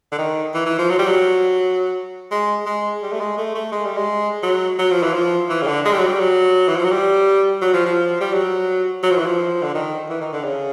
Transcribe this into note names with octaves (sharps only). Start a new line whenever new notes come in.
D3
D#3
E3
E3
F3
F#3
G3
F#3
G#3
G#3
G3
A3
G#3
A3
A3
G#3
G3
G#3
F#3
F#3
F3
E3
F3
E3
C#3
D3
G#3
G3
F#3
G3
F#3
E3
F3
F#3
G3
F#3
F3
F3
G3
F#3
F#3
F3
E3
F3
D3
D#3
E3
D#3
D3
C#3